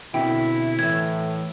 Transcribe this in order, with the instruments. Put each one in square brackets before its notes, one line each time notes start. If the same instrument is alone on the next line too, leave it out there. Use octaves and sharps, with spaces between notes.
[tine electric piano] B2 D3 C4 [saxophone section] E4 [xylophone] G5
[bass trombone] A2 [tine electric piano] E3 E6 [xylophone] G#6